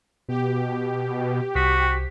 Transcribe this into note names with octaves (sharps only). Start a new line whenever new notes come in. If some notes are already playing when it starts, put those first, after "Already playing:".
B2 G4
C2 F#4 B6